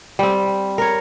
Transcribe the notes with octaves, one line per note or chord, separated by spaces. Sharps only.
G3 C4
A#4 C#5